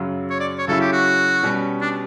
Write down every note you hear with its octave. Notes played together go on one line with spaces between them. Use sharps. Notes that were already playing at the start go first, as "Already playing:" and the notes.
Already playing: F#2 C#3 F#3
C#5
D5
C#5
C#3 F#3 C#4 E4 A4
G4
F#4
B2 G3 C#4
D4